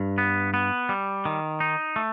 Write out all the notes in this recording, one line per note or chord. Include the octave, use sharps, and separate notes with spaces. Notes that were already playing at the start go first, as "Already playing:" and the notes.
Already playing: G2
B3
B3
G3
D#3
D#4
A3